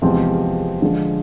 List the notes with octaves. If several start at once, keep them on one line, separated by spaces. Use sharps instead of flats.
E2 C3 F3 G#3 C4
D3 F3 G#3